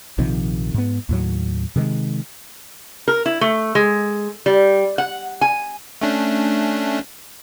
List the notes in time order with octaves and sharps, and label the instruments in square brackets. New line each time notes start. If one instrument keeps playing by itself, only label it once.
[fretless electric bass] A#1 C3 D#3 F3
G#2 B3
D#2 A2 F#3
C3 D#3 G3 G#3
[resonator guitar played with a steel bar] A#4
E4
A3
G#3
G3
F#5
G#5
[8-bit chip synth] A3 C#4 D4